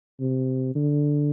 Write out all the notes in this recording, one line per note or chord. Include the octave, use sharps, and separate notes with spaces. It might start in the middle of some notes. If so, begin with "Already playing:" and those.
C3
D3